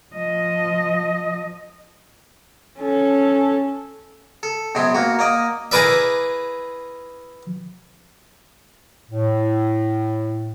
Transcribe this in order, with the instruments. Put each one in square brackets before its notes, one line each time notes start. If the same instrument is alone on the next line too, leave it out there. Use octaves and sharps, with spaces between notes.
[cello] F3 D#5
[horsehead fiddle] C#4 A4
[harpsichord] A4
F#2 B2 G#3 C4 C6
A#3 F#4
A#3 D5 D#5
E4 G#4 A#4 B4 D5 E5
[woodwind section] A2